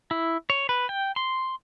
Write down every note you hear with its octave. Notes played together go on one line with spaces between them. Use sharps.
E4
C#5
B4
G5
C6